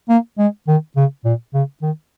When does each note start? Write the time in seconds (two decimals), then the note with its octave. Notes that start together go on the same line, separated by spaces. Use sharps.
0.09 A#3
0.38 G#3
0.68 D#3
0.96 C#3
1.25 A#2
1.54 C#3
1.82 D#3